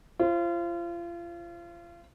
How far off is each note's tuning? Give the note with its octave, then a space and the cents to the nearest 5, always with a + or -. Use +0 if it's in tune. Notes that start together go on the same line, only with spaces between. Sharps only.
F4 -35 C5 +25